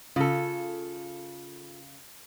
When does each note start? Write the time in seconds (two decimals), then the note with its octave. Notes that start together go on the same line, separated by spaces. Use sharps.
0.16 C#3 F4 A4